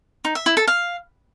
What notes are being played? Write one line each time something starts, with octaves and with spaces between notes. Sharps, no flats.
D#4
E5
E4
A4
F5